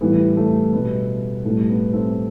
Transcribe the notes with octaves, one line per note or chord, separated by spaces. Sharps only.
A2 E3 G3 B3
A3
B2 G3 B3
A2 G3 A3
B3
A3 C4